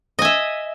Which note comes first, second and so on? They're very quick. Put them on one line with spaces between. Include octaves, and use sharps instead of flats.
D#5 G#5 E5